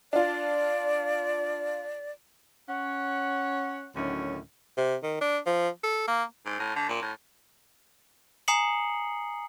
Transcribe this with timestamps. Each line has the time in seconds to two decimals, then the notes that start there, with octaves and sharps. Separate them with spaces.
0.13 D4 F4 D5
2.69 C#4 C#5 F#5
3.95 D2 A2 D#3 F#3 C#4
4.78 C3
5.03 D#3
5.21 D4
5.46 F3
5.83 A4
6.08 A#3
6.46 G#2
6.59 A2
6.76 D3
6.89 A#2
7.02 A2
8.48 G#5 A#5 D#6 C7 C#7 F#7